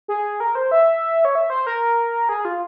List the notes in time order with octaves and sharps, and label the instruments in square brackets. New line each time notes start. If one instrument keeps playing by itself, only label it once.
[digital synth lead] G#4
A#4
C5
E5
C#5
E5
C5
A#4
G#4
F4